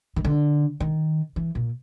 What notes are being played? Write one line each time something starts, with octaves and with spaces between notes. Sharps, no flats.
D#3
D3
D#3
E3
A#2